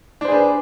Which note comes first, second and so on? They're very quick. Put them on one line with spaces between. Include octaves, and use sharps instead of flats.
D4 C5 G#4 B4